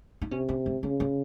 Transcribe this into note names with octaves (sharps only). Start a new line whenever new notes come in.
D#4
C3 C#4
C#4
A3
C#3 C#4
C#4